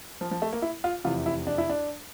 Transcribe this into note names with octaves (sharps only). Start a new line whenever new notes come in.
F3
F3
A3
A#3
E4
F4
F1 E2 C3 E3 F4
E4
D4
E4
D4